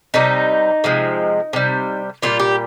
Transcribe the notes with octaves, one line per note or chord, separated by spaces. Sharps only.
C3 G3 D#4
C3 F3 G#3
C3 G3
A#2 G3 F4
G4